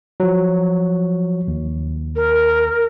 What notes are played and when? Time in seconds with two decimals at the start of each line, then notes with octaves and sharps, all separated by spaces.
0.20 F3 F#3
1.48 D#2
2.15 A#4